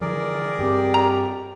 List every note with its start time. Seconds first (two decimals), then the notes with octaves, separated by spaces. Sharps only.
0.01 D3 E3 F3 G#4 A#4 D5
0.59 G2 C4 G4
0.94 A#5